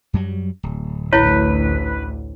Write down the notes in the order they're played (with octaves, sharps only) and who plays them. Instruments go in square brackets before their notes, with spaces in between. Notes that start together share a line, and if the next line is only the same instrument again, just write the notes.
[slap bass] F#2 F#3 G3
D1
[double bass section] A1 D2 [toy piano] E4 C#5 [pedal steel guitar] B4